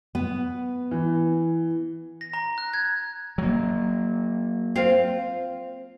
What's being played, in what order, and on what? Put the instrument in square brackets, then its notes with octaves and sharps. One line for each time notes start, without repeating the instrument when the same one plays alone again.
[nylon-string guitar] B3
[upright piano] E3
[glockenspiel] A#6
A#5
F#6
G#6
[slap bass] F#3 A#3
[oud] C4 F4